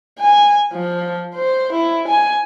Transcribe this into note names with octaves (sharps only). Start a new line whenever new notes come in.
G#5
F3
C5
E4
G#5